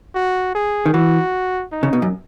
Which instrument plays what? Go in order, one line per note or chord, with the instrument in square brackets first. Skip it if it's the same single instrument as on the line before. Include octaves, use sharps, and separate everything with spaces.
[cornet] F#4
G#4
[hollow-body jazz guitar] D#3
[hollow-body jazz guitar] E3 [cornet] F#4
[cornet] D#4
[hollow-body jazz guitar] C#3
B2
F#2